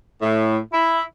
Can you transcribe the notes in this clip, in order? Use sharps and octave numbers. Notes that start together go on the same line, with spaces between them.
A2
E4